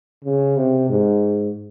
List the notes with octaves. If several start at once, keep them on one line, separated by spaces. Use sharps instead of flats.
C#3
C3
G#2